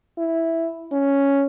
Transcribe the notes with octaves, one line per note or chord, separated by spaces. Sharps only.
E4
C#4